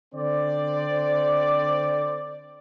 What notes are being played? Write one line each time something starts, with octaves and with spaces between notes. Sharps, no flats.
D3 C4 A4 C5 D5